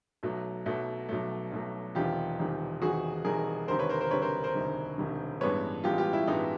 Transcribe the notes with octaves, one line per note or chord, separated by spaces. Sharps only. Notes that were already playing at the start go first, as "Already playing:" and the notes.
B1 B2 F#3 A3
B1 B2 F#3 A3
B1 B2 F#3 A3
B1 B2 F#3 A3
E1 E2 C3 D#3 F4 G4
E1 E2 C3 D#3
E1 E2 C3 D#3 F#4 G#4
E1 E2 C3 D#3 G#4 A#4
E1 D2 C3 D#3 A#4 C5
B4 C#5
A#4 C5
A#4 C5
E1 D2 C3 D#3 B4 C#5
A#4 C5
A#4 C5
E1 D2 C3 D#3
E1 D2 C3 D#3
A1 G2 E3 G#3 B3 B4 C#5
A1 G2 E3 G#3 B3 F4 G4
F4 G4
E4
A1 G2 E3 G#3 B3 D#4